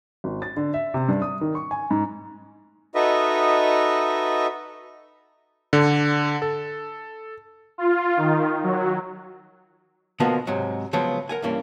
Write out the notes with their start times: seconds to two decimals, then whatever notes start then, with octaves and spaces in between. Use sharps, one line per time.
0.24 G#1
0.42 A6
0.57 D3
0.74 E5
0.94 C3
1.08 G2
1.22 D#6
1.41 D#3
1.55 C#6
1.71 G#5
1.91 G#2
2.95 D#4 F#4 A4 B4 D#5 E5
5.73 D3
6.42 A4
7.78 F4
8.17 D#3
8.63 F#3
10.20 B2 D3 F3 A#3 B3 F#4
10.47 G#2 C3 F#3
10.93 C#3 F3 F#3 G#3 B3
11.29 A#4 F#5 G#5
11.42 G2 E3 A#3 C#4